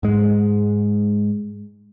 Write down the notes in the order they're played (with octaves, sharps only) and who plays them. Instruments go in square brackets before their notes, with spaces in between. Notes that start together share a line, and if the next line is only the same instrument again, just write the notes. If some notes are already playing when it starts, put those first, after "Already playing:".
[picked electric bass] G#2 G#3